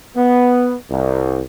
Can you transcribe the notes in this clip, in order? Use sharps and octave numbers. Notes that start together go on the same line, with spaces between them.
B3
C2